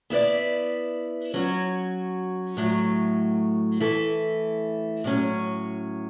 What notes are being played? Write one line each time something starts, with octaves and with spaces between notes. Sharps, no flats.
B3 E4 B4 D5
F#3 C#4 F#4
A2 F#3 A3
E3 A3 E4 A4
A2 F#3 C#4